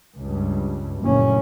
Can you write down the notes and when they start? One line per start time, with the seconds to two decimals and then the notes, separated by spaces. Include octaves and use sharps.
0.17 C#2 G2
1.00 F#1 D2 A#2 C#4